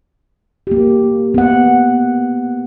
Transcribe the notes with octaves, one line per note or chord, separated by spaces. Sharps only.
A#3 G4
B3 F#5